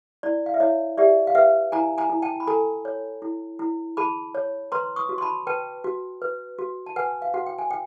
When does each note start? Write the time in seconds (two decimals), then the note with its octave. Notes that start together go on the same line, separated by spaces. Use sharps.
0.23 E4 D5
0.46 F5
0.54 E5
0.60 E4 C#5 D#5
0.98 G4 D5 E5
1.27 F5
1.35 B4 E5 F#5
1.72 E4 G#5 A#5
1.98 G#5 A#5
2.10 E4
2.22 G5 A5
2.40 B5
2.47 A4 G#5 A#5
2.85 C#5
3.22 E4
3.59 E4
3.97 G#4 A5 B5
4.35 C#5
4.72 B4 A#5 C6
4.96 C#6 D#6
5.09 F#4
5.18 C6
5.22 A5 B5
5.47 B4 G5 A5
5.84 F#4
6.22 B4
6.58 F#4
6.86 A5
6.96 B4 F#5 G#5
7.22 F5
7.34 F#4 F#5
7.47 G5
7.58 G#5
7.71 G5